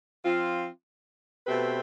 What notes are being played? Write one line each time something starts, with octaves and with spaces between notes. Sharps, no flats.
F3 C4 F4
B2 A3 C4 G4 B4